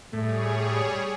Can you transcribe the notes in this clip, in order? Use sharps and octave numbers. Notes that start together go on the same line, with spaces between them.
A2 G3 A3 G#4 C#5